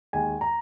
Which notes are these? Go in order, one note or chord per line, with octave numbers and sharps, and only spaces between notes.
D#2 D#3 G#3 G#5
A#5